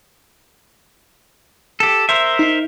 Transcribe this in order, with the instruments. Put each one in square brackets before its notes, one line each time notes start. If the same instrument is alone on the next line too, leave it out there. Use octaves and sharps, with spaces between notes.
[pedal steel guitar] G4 A4
A#4 C5 E5
[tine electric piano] D#4